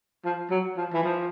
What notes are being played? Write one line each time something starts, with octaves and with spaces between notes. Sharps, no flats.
F3
F#3
F3
E3
F3